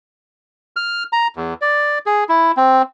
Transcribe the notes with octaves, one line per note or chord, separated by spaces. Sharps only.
F6
A#5
E2
D5
G#4
E4
C4